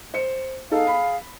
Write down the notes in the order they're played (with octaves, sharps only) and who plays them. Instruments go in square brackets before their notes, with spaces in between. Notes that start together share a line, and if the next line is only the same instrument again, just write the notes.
[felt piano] C5 C#7
[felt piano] D#4 A4 [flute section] G#4 F5
[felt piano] B5